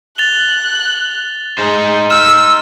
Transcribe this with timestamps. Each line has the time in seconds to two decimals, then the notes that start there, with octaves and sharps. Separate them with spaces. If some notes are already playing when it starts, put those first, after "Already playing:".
0.18 F#6 A6 F7 G7
1.58 D#4 G#4 C5
2.10 E6 F6 E7